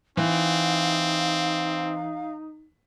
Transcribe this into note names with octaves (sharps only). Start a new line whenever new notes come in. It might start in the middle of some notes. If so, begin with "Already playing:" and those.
E3 C4 D#4 F5